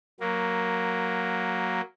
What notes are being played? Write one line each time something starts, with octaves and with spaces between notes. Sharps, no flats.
F#3 A#3